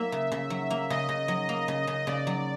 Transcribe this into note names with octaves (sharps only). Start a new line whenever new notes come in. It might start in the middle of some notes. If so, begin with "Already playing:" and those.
Already playing: F#3 A#3 E5
C#3
C#3
F#3
A#3
C#3 D#5
C#3
F#3
A#3
C#3
C#3
C#3 D5
F#3